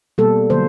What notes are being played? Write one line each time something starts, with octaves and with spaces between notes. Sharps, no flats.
B2 G3 A#3 A4
D3 F#3 A#3 C5